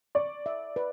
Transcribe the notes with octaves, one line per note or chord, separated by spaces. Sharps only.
D5 C#6
E5
B4